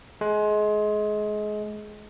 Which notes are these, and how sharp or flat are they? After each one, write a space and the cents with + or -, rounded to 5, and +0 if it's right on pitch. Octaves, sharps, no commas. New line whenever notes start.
G#3 +25